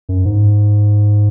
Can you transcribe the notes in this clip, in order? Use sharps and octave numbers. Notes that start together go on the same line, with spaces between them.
F#2
G#2